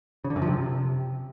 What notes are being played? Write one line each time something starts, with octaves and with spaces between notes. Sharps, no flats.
C#3
D3
F#2
F3
C3